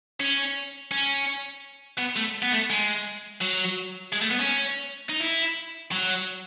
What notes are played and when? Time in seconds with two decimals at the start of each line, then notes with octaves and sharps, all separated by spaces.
0.20 C#4
0.91 C#4
1.98 B3
2.16 A3
2.42 B3
2.52 A3
2.70 G#3
3.41 F#3
4.13 G#3
4.22 A3
4.31 B3
4.40 C#4
5.09 D#4
5.20 E4
5.91 F#3